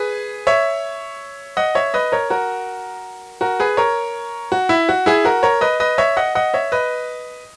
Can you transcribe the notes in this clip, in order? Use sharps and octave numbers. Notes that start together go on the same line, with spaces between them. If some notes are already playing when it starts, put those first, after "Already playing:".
Already playing: G#4 B4
C#5 E5
D#5 F#5
C#5 E5
B4 D#5
A#4 C#5
F#4 A#4
F#4 A#4
G#4 B4
A#4 C#5
F#4
E4
F#4
E4 G#4
F#4 A#4
A#4 C#5
B4 D#5
B4 D#5
C#5 E5
D#5 F#5
D#5 F#5
C#5 E5
B4 D#5